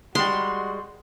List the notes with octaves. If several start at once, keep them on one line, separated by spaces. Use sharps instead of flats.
G3 G#3 F#4 C6